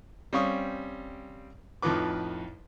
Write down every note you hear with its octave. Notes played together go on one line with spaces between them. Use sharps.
G3 C4 C#4 F5 C#6 D#6
F2 A2 F3 D#4 B4 D6